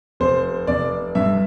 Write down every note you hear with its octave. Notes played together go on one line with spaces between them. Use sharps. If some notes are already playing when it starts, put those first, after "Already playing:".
F1 C5
F1 D5
G2 E5